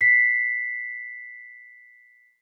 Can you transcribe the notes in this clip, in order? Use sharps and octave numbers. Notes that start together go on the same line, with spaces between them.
B6 C7